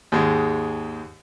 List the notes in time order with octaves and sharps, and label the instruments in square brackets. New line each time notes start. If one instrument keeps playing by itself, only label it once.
[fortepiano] D#2 G#2 G#3